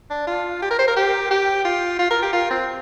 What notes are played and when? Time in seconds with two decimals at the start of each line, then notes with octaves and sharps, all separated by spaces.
0.10 D4
0.27 F4
0.62 G4
0.71 A#4
0.79 C5
0.88 A#4
0.96 G4
1.31 G4
1.65 F4
1.99 F4
2.11 A#4
2.22 G4
2.33 F4
2.51 C4